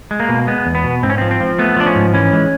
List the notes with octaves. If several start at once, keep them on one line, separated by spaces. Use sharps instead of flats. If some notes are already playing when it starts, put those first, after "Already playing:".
G#3
A#3
B2
G#3 B3
E2
B3
B2
G#2 C4
C#4
F3 C4
C4
F3
A3 B3
F3 D4
C#4
G#2
E3 C#4
G#3